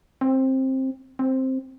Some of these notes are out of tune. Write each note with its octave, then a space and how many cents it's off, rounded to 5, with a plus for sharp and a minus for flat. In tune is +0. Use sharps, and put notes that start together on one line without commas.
C4 +15
C4 +5